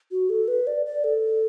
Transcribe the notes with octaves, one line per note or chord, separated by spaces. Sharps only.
F#4
A4
B4
D5
D5
A4